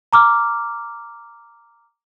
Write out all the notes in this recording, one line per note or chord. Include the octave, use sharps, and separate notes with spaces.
A#5 D6 F6